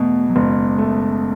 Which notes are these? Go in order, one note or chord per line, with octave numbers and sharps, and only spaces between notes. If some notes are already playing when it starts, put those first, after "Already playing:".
Already playing: E2 B2 A3
F#3
F#1 G#3
A3